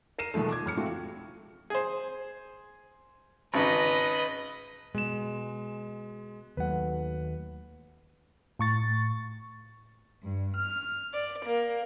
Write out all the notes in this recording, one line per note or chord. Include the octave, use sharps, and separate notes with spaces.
A#4 C7 D#7 E7
B2 D#3 F3 G#3 A3
D6 G#6
F2 F6 C#7
E3 G#3 A3 C4 F4 F#4
G#4 C5
G#1 C#3 D#4 B4 D#5
B2 G#3 E7
D#2 F#3 A3 B4 F#5
A2 C#6 A6
G2
F6
D5
A#3